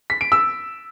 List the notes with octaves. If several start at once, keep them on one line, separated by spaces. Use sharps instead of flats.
B6
D7
E6